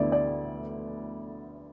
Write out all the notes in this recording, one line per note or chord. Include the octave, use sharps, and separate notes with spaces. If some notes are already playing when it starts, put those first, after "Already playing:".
Already playing: D2 D3 B3 E4 D5
D5